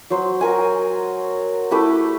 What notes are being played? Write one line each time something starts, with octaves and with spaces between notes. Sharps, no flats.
F#3 C5
F#4 A#4 G#5
A3 E4 G4 B4